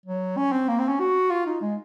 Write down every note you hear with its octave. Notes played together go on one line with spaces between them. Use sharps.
F#3
C#4
C4
A#3
C4
C#4
F#4
F4
D#4
G#3